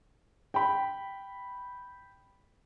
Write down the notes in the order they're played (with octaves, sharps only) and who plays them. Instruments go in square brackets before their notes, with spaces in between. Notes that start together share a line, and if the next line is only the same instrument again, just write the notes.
[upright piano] G5 B5